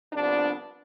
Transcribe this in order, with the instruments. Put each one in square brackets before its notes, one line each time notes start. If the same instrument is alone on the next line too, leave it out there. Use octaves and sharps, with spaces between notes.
[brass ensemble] C2 C3 F3 B3 D4